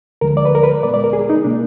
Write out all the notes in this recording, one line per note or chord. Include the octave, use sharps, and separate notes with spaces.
D2 D3 F3 G#3 A#4
D5
B4
A#4
B4
A#2 G#3 B3 D5
D5
A#4
G#4
D#4
B2 A#3 D4